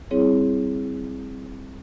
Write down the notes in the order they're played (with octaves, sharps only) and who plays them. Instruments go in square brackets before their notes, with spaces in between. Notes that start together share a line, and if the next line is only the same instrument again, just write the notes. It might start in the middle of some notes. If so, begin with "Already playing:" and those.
[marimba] G3 C4 E4 G#4 C#5